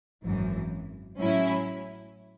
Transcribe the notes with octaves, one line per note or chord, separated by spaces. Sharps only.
G#1 F#2 E3
A2 F#3 C#4 E4